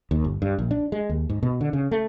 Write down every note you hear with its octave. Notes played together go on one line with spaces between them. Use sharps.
D#2
G1
G2
A#1
D4
G#3
D#2
G#2
B2
D3
C#3
A3